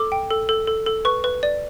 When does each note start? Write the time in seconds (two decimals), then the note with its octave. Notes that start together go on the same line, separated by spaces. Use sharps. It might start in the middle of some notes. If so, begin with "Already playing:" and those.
Already playing: A4 D6
0.12 G5
0.31 A4
0.49 A4
0.67 A4
0.86 A4
1.05 B4 C#6
1.24 B4
1.43 D5